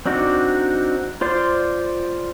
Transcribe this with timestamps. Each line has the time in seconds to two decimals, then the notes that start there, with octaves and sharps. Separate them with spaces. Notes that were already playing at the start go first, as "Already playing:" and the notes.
0.06 C4 D4 D#4 F#4 D5
1.21 F4 C5 D5 C6